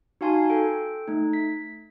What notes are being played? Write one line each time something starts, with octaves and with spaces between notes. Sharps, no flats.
D#4 F#4 F5 G#5 A5 C6
A4 G5
A3 D#4
B6